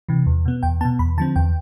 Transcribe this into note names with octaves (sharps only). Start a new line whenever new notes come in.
C3 E3
E2
B2 B3
E2 G5
B2 B3 A5
E2 B5
D3 F3 C4 A5
E2 G5